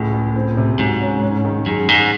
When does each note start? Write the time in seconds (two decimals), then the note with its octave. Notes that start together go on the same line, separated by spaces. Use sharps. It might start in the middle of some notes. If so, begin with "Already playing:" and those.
Already playing: C#2 A2
0.13 C#2
0.36 C4
0.57 C3
0.79 G#2 F#3
1.01 C#4
1.23 C#4
1.45 D#3
1.66 F#2 G#3
1.88 G#2 G#3